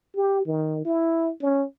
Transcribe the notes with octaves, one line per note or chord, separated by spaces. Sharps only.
G4
D#3
E4
C#4